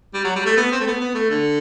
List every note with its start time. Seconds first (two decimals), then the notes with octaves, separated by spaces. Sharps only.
0.14 G3
0.25 F#3
0.36 G3
0.46 A3
0.57 B3
0.72 C4
0.80 A3
0.87 B3
1.01 B3
1.15 A3
1.30 D3